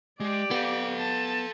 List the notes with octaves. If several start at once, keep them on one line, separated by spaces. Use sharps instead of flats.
G#3 G4 D5
B3 A4 F5
A5